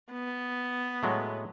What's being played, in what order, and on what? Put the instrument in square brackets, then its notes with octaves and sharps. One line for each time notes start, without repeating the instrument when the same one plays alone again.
[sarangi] B3
[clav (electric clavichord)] A2 F#3 G#3